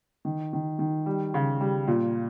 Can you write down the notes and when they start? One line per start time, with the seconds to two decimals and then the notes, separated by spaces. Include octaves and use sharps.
0.25 D#3
0.53 D#3
0.79 D#3
1.06 G3
1.34 C#3
1.61 G3
1.87 A#2